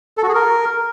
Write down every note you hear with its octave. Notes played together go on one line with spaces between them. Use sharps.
A4
F#4
G#4
A#4